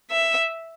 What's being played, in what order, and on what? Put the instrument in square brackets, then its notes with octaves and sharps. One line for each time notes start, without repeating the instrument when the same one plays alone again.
[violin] E5